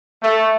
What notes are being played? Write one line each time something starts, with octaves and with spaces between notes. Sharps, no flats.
A3